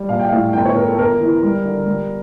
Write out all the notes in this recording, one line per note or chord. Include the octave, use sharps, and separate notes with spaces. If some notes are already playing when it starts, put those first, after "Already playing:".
Already playing: G3
A#1 F5
G5
A2 F5
G1 G5
C#5
G1 A#4
A4
G1 A#4
E3
G3
D3
G3